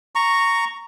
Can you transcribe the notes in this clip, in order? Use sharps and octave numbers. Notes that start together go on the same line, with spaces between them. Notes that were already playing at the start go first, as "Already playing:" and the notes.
A#5 C#6